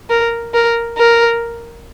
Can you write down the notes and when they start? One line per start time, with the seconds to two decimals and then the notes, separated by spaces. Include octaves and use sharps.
0.10 A#4
0.54 A#4
0.98 A#4